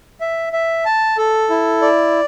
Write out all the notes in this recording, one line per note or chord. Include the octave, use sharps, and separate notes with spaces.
E5
E5
A5
A4
E4
D5